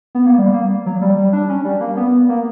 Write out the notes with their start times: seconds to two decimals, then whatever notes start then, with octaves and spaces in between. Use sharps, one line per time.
0.15 B3
0.26 A#3
0.39 G3
0.54 A#3
0.86 F#3
1.02 G3
1.17 G3
1.33 D4
1.49 C#4
1.64 G3
1.81 A#3
1.97 B3
2.29 A#3